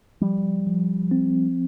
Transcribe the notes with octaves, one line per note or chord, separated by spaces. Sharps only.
F3 G3
F3
C4